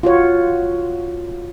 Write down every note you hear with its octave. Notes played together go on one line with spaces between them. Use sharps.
F4 F#4 C#5